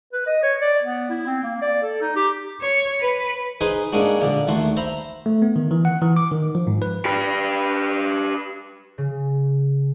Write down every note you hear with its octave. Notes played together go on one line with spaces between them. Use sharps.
B4
D#5
C#5
D5
B3
E4
C4
A#3
D5
A4
D#4
G4
C#5
B4
D#4 G#4 B4 C5 C6
G#2 G#3 A#3 C#4 D4 F#4
A#1 D3 D4
D#2 A3 F#4 C6
C5 E5 A#5 B5
A3
B3
D#3
E3
F#5
E3
D6
D#3
F3
G#2
B4
G4 B4
C#3